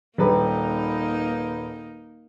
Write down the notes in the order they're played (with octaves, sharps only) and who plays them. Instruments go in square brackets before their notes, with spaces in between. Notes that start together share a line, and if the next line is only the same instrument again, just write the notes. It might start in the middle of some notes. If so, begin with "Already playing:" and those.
[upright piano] D#1 B4 [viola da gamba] A#3 D#4